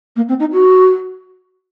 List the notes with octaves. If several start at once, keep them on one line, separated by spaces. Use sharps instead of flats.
A#3
C4
D#4
F#4